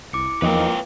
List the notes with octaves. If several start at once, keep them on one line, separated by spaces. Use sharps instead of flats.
C2 E4 D6 C#7
E2 F3 A#3 D#4 B4 C#5 D#5 G5